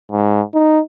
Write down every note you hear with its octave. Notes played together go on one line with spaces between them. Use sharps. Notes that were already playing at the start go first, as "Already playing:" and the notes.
G#2
D#4